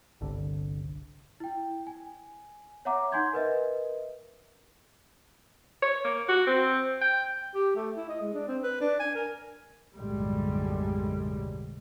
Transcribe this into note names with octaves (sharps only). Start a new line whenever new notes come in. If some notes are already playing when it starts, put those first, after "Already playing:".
G1 C2 D3
E4 G5
G#5
C#5 E5 F#5 A#5 D6
D#4 F#5 G#5 C6 G6 G#6
A#4 B4 D#5 E5
C#5
A#3
F#4
C4
G5
G4
A3
E4
D#5
G#3
D4
C4
B4
D4
G#5
A#4
B1 F#2 A2 D3 G3 G#3